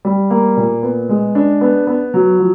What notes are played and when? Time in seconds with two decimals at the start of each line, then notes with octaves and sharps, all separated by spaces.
0.05 G3
0.30 A#3
0.57 A#2
0.83 B3
1.09 G#3
1.35 D4
1.61 B3
1.87 B3
2.14 F#3
2.39 F3